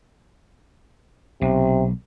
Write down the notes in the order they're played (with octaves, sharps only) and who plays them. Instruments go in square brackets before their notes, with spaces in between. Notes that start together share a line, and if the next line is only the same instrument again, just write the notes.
[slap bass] B1 [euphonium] C3